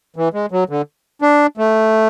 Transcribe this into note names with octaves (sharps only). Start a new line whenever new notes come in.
E3
G#3
F#3
D3
D4
A3